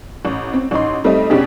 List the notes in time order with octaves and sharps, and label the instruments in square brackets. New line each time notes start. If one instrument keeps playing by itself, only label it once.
[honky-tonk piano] A1
C4
A1 D#4 C6
G3 A3 C4 D#4 D#5
B2 C#4 D4 G4 G#4